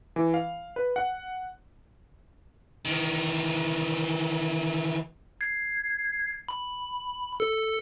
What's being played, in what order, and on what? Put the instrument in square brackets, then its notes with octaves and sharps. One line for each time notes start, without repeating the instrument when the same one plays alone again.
[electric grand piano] E3
F5
B4
F#5
[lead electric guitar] D#3 E3
[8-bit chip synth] G#6 C7
B5
A4